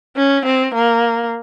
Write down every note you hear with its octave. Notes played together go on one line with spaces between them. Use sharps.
C#4
C4
A#3